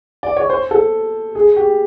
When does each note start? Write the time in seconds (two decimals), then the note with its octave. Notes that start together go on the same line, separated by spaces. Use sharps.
0.23 D5
0.37 C#5
0.50 C5
0.71 A4
1.35 G#4
1.56 G4